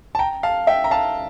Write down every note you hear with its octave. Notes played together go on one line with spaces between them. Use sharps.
A5
G5 A#5
F5 A5
E5 G5
A#5
F5 A5